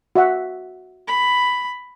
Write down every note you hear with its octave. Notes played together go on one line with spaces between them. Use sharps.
F#4 E5 F#5
B5